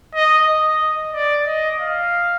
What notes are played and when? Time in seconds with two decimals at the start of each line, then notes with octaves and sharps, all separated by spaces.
0.14 D#5
0.47 D#5
1.13 D5
1.46 D#5
1.79 F5